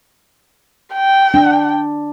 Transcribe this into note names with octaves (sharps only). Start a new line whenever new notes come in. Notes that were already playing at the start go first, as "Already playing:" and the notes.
G5
D4